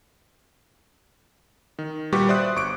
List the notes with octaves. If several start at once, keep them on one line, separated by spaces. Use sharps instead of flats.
D#3
A#2 G3 F#4 G4 B4 C#6
C5 D5 E5 C6 D#6 F#6
G1 C#6 D6 D7